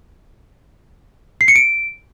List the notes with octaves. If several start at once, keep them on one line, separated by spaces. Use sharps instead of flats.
C7
C#7
D7